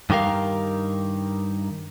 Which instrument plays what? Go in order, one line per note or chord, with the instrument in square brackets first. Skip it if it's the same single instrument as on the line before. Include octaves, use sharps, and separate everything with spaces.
[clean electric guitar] G2 D#3 G4 A#4 F5